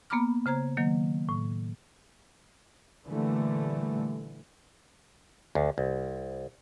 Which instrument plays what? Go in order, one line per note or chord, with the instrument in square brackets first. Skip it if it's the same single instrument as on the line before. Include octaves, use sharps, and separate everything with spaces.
[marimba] A#3 B3 A#5 B5 D6 F6
C#3 C5 A#5 G#6
D#3 F#3 A#3
A2
[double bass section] A#2 D3 E3 G3 A3
[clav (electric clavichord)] D2
C2